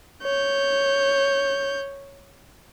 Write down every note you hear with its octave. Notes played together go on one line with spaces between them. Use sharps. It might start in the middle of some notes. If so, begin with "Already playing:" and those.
C#5 G6